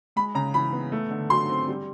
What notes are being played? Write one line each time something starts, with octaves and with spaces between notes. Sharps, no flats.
G#3 B5
C#3 A#5
E3 B5
B3
A3
D3
F#3 C6
C4
G3